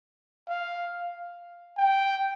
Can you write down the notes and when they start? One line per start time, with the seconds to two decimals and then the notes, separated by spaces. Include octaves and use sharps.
0.48 F5
1.78 G5